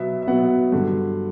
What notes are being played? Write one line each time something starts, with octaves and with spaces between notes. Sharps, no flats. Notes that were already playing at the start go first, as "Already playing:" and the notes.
Already playing: B2 F#3 B3 E5
E5
B2 F#3 B3 F#5
G2 D3 F#3